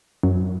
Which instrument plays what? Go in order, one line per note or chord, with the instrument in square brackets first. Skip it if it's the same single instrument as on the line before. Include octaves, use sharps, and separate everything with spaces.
[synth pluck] F#2